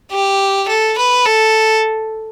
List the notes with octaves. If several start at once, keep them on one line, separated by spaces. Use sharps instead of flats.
G4
A4
B4
A4